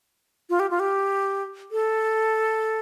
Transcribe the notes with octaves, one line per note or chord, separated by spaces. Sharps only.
F4
G4
F4
G4
A4